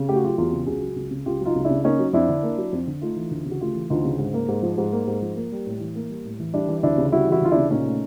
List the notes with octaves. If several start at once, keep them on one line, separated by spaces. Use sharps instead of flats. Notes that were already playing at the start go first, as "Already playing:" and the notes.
Already playing: C#3
A3 G4
F#4
F#3 F4 G4
E2 F4 G4
C#3
C#2 F#4 G#4
F#3
C#2
C#3
C#2 F4 G4
F#3 D#4 F4
C#2
D4 E4
C#3
A#3 C#4 D#4
F#3
F2 D4 E4
D3
A#3
F#3
F2
D3
A3 D#4 F4
E3
D2
C#3
F#4
A3 F4 G4
E3
D2 D#4 F4
C#3
G#2
A#3
G#2
F3
G#2
A#3
G#2
F3
A#3
G3
A2
E3
A#3
G3
A2
E3
G3 D4 E4
E3
D2 D4 E4
C#3
G3 E4 F#4
E3 E4 F#4
D2 F4
D4 E4
C#3
A#2 C#4 D#4
A3